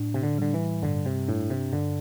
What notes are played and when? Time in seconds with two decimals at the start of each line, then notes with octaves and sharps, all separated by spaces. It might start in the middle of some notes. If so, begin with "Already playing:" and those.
Already playing: A2 D4
0.14 C3
0.23 D3
0.38 D3 G3
0.54 E3
0.83 G2 D3
1.06 C3
1.28 A2 D4
1.50 C3
1.73 G2 D3